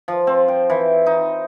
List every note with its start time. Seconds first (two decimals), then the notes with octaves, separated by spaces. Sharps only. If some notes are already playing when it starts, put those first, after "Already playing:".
0.08 F3
0.27 C4
0.48 G5
0.70 E3
1.06 D#4